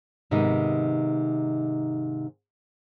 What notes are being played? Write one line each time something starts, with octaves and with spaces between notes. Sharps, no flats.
G#2 C3 D#3 B3 D#4